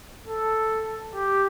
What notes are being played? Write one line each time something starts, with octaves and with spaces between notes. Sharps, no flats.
A4
G4